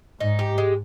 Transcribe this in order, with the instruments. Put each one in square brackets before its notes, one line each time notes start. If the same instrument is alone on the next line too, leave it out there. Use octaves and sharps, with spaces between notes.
[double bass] G#2 [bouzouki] D#4
[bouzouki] G4
G#3